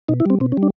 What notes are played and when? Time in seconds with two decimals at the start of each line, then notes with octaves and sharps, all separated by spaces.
0.08 B2 D#4
0.20 E4
0.26 G3 C4
0.40 B2 C4
0.52 C#4
0.57 G3
0.63 D4